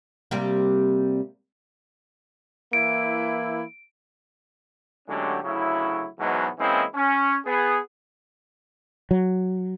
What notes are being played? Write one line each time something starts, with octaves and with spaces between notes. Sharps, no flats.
C3 G3 A#3
E3 A#3 E4 D7
A2 D3 F#3 G#3 C#4 G4
D2 C#3 F#3 E4
E2 G#2 B2 F#3 G#3 B3
E3 G#3 A#3 C4 C#4 E4
C#4
B3 G#4
F#3